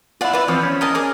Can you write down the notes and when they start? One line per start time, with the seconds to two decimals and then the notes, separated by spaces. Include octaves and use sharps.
0.21 E4 F4 D5 F#5
0.33 E4 B4 D5
0.48 E3 F3 C4 C#5
0.63 C#4
0.81 A#4 D#5 A5
0.95 G#4 A#4 D6